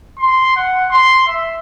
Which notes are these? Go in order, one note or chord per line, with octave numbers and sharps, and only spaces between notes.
C6
F#5
C6
E5